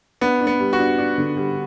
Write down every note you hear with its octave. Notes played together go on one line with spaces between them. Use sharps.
B3 D4
D4
B3
G3
F#4
D4
D4
D3
G3